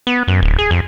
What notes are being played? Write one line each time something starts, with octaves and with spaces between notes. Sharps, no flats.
B3
F#2
D1
G#4
F2